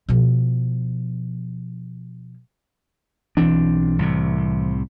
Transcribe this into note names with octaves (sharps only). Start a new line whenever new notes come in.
B2 F3
B1 E3 C4 D4
C2 A2 C3